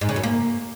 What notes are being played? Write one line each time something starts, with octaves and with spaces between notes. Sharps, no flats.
G#2
C#3
F#2
A#3